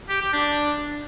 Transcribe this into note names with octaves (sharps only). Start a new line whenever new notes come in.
G4
G4
D4